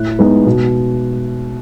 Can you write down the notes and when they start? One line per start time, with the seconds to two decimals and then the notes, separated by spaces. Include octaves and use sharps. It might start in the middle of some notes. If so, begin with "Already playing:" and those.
Already playing: A2 F#6
0.19 G#3 B3 D#4
0.46 B2